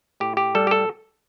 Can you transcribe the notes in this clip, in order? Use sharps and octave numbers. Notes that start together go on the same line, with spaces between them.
A2 G4
G4
G3 A4
G4
A4